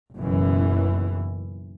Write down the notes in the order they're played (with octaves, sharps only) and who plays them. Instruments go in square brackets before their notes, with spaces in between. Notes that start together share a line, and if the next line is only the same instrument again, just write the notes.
[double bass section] F#1 B1 F#2 E3